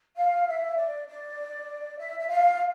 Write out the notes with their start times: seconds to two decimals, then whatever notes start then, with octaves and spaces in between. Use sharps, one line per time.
0.17 F5
0.47 E5
0.77 D5
1.08 D5
1.99 E5
2.19 E5
2.28 F5